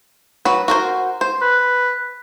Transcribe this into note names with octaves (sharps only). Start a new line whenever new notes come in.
F#3 F#4 B4
F#4 A#4 C5
C5
B4